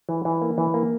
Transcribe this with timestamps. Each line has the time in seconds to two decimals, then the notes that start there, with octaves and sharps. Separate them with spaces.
0.09 E3
0.25 E3
0.42 A#3
0.58 E3
0.74 A#3